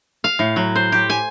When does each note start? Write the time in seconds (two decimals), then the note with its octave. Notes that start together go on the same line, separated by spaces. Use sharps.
0.24 F5
0.39 A2
0.56 F#3
0.76 C5
0.92 G4
1.10 G#5